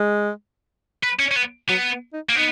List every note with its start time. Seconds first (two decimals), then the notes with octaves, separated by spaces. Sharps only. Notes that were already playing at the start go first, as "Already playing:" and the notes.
Already playing: G#3
1.03 B4
1.19 C#4
1.31 C#4
1.36 B3
1.69 F#3 B3
1.91 B3
2.13 D#4
2.29 A#3
2.36 B3 D#4